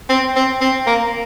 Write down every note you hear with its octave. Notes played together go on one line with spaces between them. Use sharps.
C4
C4
C4
A#3